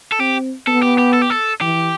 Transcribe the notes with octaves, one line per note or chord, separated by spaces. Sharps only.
A4
C4 G4
B3 A4
G4
G4
A4
G4
A4
E3 G4